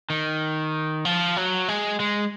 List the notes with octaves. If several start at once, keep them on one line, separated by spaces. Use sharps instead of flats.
D#3
F3
F#3
G#3
G#3